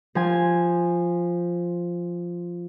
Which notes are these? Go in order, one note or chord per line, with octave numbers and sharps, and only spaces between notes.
F3 G#5